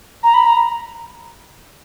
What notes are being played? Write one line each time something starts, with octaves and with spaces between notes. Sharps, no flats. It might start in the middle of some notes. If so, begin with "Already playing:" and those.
A#5
B5
A#5